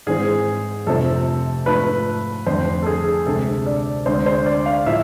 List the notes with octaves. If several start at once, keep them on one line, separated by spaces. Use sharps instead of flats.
G#2 E3 G#3 C4 G#4
F2 C3 F3 A3 C4 A4
G#2 F3 A3 B4
F2 D3 A3 C4 C5
A4
G#4
D2 C3 G#3 C4 A4
D5
D2 D3 G#3 C4 C5
C5
D5
F5
A2 F3 E5